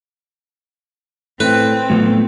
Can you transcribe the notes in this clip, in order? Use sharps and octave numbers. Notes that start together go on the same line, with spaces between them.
A2 C4 B4
A2 F3 F#3 A3 B3